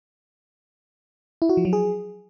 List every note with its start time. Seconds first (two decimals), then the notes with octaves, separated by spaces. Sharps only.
1.42 E4
1.49 F#4
1.57 F3
1.65 F#3
1.73 G#4